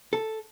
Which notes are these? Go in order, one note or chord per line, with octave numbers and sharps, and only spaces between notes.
A4